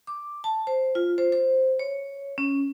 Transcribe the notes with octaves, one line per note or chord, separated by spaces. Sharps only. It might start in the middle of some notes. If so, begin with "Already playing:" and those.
D6
A5
C5
F4
C5
C5
C#5
C#4